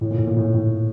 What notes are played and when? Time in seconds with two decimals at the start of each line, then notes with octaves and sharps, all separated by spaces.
0.01 A2
0.11 A#2
0.18 A2
0.27 A#2
0.37 A2
0.44 A#2
0.54 A2